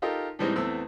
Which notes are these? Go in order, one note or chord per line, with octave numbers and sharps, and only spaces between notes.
D#4 F4 G4 A4 A#4 D#5
A2 E3 G3 G#3 C4 D#4
E2 A3 B3 C4 E6